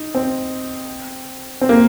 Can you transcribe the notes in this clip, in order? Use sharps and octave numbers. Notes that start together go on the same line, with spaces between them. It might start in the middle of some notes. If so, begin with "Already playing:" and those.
Already playing: D#4
C4
C4
A#3